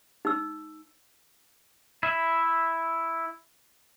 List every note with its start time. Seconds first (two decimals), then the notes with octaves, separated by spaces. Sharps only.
0.25 D#4 E6
2.03 E4 E5